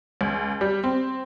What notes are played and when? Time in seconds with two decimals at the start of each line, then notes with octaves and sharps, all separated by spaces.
0.21 C#2
0.61 G3
0.84 C4